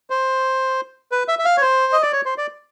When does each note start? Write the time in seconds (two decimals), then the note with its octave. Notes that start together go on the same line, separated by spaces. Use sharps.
0.10 C5
1.12 B4
1.28 E5
1.39 E5
1.45 F5
1.57 C#5
1.62 C5
1.93 D#5
2.02 D5
2.12 C#5
2.25 C5
2.38 D5